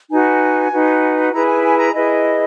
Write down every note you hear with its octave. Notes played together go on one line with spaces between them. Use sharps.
D#4 F#4 B4 G#5
D#4 F#4 B4
E4 G#4 B4 A#5
G#5
G#5
A#5
E4 G#4 B4 D#5